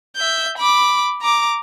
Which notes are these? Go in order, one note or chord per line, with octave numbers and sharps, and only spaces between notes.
E5 G6
B5 D6
A#5 D6